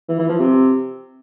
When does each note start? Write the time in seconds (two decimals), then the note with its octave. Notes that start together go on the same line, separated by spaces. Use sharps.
0.09 E3
0.19 E3
0.29 F3
0.39 C3